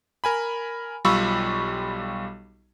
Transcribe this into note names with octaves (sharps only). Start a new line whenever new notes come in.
A#4 G#5 B5
B1 G3 F4 B5 C#6 E6